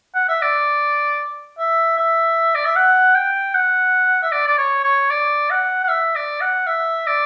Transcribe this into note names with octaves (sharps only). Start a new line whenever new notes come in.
F#5
E5
D5
E5
E5
D5
E5
F#5
G5
F#5
E5
D5
D5
C#5
C#5
D5
F#5
F#5
E5
D5
F#5
E5
D5